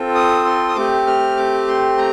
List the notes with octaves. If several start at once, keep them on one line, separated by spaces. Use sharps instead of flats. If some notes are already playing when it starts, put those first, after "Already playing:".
Already playing: C4 F4 A4
D#6
C6
D#6
A3 C4 G4 D6
F6
D6
C6
A#5